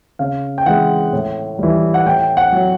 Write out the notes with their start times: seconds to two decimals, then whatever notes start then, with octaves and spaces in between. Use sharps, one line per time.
0.19 C#3 F5
0.58 G5
0.66 E3 G#3 F#5
1.13 A2
1.59 E3 G3
1.94 F#5
2.06 A2 G5
2.37 F#5
2.52 F#3